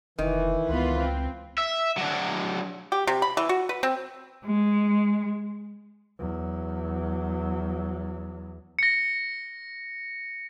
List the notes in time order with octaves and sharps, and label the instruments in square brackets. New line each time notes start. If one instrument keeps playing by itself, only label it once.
[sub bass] F1 [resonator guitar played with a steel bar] D#3 [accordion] E3
[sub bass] C#2 [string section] B3 F4 B4
[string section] C4
[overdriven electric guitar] E5
F#3 D4
[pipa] G4
C3
B5
E3
F#4
B4
C4
[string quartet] G#3
[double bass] E2 F#3
[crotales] A#6 C#7